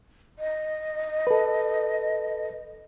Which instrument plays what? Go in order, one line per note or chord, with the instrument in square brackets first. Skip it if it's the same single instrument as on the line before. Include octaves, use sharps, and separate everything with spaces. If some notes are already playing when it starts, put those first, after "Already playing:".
[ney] D#5
[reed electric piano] A4 B4